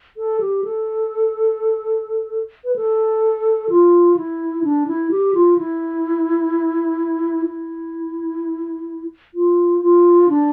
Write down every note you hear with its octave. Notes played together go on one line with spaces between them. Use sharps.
A4
G4
A4
B4
A4
F4
E4
D4
E4
G4
F4
E4
E4
F4
F4
D4